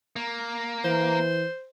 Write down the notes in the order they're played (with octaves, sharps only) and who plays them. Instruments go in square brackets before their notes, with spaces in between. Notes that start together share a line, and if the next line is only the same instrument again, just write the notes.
[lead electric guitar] A#3
[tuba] E3 [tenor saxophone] C5